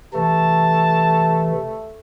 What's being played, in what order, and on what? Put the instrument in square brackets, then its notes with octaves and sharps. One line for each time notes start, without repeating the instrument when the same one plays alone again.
[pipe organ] C3 E3 [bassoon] A3 [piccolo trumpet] A5